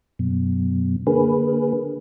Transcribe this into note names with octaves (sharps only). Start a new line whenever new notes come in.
F#2 B2
D3 A#3 G#4 B4